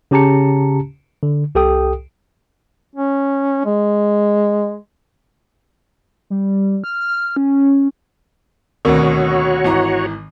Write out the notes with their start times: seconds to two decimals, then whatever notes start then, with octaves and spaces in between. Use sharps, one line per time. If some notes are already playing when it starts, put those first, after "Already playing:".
0.11 C#3 C#4 G4 A5 A#5 C#7
1.23 D3
1.55 C2 G4 A4 G5 D#6
2.96 C#4
3.66 G#3
6.30 G3
6.84 F6
7.00 F6
7.37 C#4
8.85 D2 B2 D#3 C4 F#4 A#4 C#5
9.64 G#1 E3 A#5